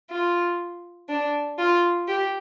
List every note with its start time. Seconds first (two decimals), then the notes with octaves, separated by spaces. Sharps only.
0.10 F4
1.09 D4
1.58 F4
2.08 G4